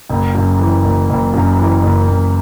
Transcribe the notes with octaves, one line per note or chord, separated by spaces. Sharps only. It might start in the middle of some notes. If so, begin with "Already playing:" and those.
F#1
F#2
E3
F#1
F#1
F#2
E3
F#1
F#1